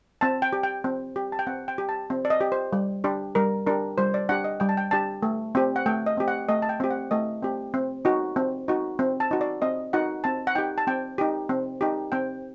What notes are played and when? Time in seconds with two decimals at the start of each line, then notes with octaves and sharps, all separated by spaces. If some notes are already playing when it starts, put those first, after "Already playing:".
0.21 C4 A5
0.42 G5
0.53 G4
0.63 G5
0.84 C4
1.16 G4
1.32 A5
1.39 G5
1.47 C4 F#5
1.68 G5
1.78 G4
1.89 A5
2.10 C4
2.25 D5
2.30 D#5
2.41 G4
2.52 C5
2.73 G3
3.04 D4 G4
3.35 G3 A#4
3.67 D4 G4 A#4
3.98 G3 C5
4.14 D5
4.29 D4 G4 F#5
4.44 D#5
4.60 G3 G5
4.69 A5
4.77 G5
4.91 D4 G4 A5
5.23 A3
5.55 C4 G4
5.76 F#5
5.86 A3 G5
6.06 D#5
6.17 C4 G4
6.28 F#5
6.49 A3 D#5
6.62 A5
6.69 G5
6.80 C4 G4
6.91 F#5
7.11 A3 D#5
7.43 C4 G4
7.74 C4
8.05 D#4 F#4
8.36 C4
8.68 D#4 F#4
8.99 C4
9.20 A5
9.31 D#4 F#4
9.41 D5
9.62 C4 D#5
9.93 D#4 F#4 F#5
10.24 C4 A5
10.47 F#5
10.55 D#4 G4 G5
10.78 A5
10.87 C4 G5
11.18 D#4 G4
11.49 C4
11.81 D#4 G4
12.12 C4 G5